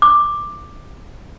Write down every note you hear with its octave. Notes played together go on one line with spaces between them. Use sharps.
D6